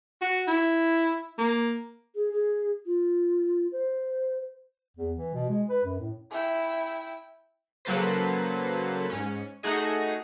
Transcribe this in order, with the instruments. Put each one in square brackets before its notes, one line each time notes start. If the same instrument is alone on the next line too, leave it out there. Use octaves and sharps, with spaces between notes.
[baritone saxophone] F#4
E4
A#3
[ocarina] G#4
G#4
F4
C5
[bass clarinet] E2
E3
B2
G#3
B4
F#2
A2
[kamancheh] E4 G5
[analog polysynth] C#3 F#3 A#3 A4 B4 C5
G#2 C#4
A3 D#4 F#4 G#4 D#5